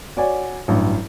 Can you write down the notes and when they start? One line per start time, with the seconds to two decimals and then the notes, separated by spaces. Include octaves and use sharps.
0.17 F#4 C#5 D5 F#5 G#5
0.68 A1 G2 F#3